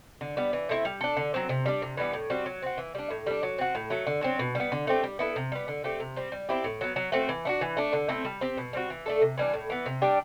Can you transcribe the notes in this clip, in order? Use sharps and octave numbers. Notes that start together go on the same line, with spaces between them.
D3
G3 B3
E3
A3 C4 E4
G3
D4 A4
D3
F#3 C4
C3
G3 D4
C3
E3 G3 B3
A2
G3 C4 F#4
F#3
C4 F#4
E3
G3 D4
A2
G3 D4
F#3
C4 F#4
A2
F#3 A3
D3
F#3 C4
B2
G3 B3
D3
A3 C4 G4
G3
B3 E4 A4
C3
G3 B3
D3
A3 C4 G4
C3
G3 C4
G3
C4 E4 G4
A2
F#3 B3
F#3
A3 C4 F#4
E3
A3 D4 F#4
E3
A3 D4
D3
A3 C4 E4
G3
C4 G4
B2
G3 C4 F#4
E3
A3 D4 A4
C3
E3 G3 D4
A2
E3 B3
C3
G3 D4 G4